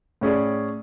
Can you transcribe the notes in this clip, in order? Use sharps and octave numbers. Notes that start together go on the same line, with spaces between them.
A2 C#4 G#4 D5